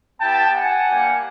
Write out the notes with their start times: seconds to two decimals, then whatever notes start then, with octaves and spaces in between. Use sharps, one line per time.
0.20 B3 E4 G4 G5 A5
0.55 F#5 G#5
0.88 G3 A#3 D4 G4